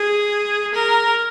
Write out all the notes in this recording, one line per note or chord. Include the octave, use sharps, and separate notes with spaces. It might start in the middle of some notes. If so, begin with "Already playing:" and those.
Already playing: G#4
A#4